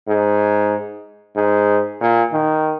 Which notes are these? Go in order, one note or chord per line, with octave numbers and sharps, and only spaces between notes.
G#2
G#2
A#2
D#3